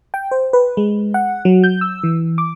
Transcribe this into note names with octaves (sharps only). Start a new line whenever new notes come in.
G5
C5
B4
G#3
F#5
F#3
G6
E6
E3
D6